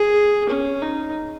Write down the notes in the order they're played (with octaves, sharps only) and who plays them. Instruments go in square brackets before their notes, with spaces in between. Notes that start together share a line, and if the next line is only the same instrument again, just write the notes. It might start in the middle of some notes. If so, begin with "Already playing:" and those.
Already playing: [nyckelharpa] G#4
C#4
D#4